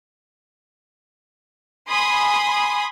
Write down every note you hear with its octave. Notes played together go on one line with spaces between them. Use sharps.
G#5 B5 C6 D#6